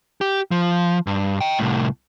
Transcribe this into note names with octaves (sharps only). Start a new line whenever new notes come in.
G4
F3
G2
D#5 G5
C2 A2